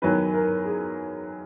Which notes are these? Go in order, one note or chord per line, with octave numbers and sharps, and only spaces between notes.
E2 D#3 F#3 B4
A#4
G#4